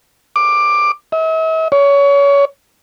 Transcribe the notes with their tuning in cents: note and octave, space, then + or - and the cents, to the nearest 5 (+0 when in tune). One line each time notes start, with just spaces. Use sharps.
D6 +10
E5 -45
C#5 +25